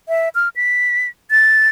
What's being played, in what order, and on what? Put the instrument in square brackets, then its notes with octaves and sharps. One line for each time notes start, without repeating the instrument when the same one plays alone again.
[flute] E5
F6
B6
A6